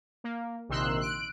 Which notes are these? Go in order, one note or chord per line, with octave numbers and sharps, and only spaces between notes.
A#3
A#1 C3 D#3 C6 E6 F#6
F#6 D7